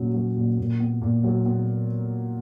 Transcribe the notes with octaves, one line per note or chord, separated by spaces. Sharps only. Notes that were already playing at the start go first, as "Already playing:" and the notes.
Already playing: A#2 F#3 C#4 F#4
F#3
A#2
A#2
B3
A#2
F#3
B3